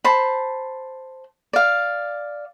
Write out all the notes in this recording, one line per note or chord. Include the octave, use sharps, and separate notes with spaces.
C5 A5 B5
D5 F5